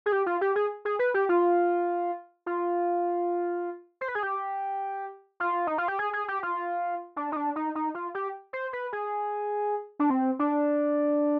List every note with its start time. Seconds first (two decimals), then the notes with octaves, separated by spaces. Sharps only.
0.06 G#4
0.12 G4
0.26 F4
0.41 G4
0.56 G#4
0.85 G#4
0.99 B4
1.14 G4
1.29 F4
2.46 F4
4.01 C5
4.08 B4
4.15 G#4
4.23 G4
5.40 F4
5.67 D#4
5.78 F4
5.88 G4
5.99 G#4
6.13 G#4
6.28 G4
6.43 F4
7.16 D4
7.32 D#4
7.36 D4
7.56 D#4
7.75 D#4
7.95 F4
8.15 G4
8.53 C5
8.73 B4
8.93 G#4
9.99 D4
10.10 C4
10.39 D4